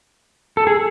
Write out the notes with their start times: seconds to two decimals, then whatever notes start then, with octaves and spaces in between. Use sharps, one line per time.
0.57 A4
0.67 G#4